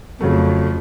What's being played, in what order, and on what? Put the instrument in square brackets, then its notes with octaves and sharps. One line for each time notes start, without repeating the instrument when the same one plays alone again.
[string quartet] F2 [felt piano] C#3 F#3 A3